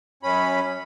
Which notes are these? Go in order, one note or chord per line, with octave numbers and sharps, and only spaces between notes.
F#2 C#4 B5